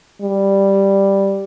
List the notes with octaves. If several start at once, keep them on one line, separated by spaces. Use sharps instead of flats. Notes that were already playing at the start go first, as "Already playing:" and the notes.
G3